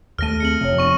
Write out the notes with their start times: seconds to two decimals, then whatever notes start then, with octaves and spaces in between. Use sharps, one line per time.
0.19 D#2 A3 F6 A#6 D#7
0.40 C4 G#4 C#7 F#7
0.61 F1 C3 F3 C#5
0.78 F3 B3 D4 C#6 D#7